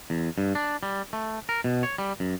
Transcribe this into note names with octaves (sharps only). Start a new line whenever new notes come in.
E2
G2
D4
G3
A3
A#4
B2
C#5
G3
F#2